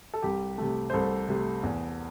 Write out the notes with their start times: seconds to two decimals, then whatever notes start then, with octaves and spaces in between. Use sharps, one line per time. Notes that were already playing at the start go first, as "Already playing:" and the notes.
0.14 A4
0.22 C2 G4
0.58 C3 A3
0.90 C5
0.93 C2 A4
1.28 C3 A3
1.63 E2